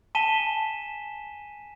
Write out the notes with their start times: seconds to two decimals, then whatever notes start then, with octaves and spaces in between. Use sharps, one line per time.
0.15 G#5 A5 B6 D#7 E7 G7